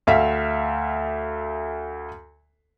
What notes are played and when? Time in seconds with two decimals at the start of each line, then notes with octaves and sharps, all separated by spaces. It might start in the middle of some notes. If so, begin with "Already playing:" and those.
0.07 D2 E5 F5 B6